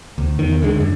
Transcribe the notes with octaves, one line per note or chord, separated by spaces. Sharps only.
D2
E2 D#3
D2 D3 G#3
F#2 D3